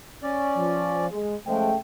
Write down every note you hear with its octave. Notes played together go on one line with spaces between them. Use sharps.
C#4 D5
F3
G#3
C#3 F3 G#3 A3 G5